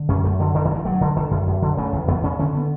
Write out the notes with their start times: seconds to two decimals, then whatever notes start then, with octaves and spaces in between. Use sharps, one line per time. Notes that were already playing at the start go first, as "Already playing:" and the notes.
Already playing: D3
0.09 F#2 C#4
0.24 F#2 A3
0.40 D3 F#3
0.55 D3 E3
0.65 D3
0.70 G2
0.75 E3
0.85 G2 F#3
1.01 D3
1.16 D3
1.31 F#2
1.47 F#2
1.62 D3
1.77 C#3 A3
1.92 E2
2.08 E2 B3
2.24 C#3 C#4
2.39 D3 C#4
2.55 B3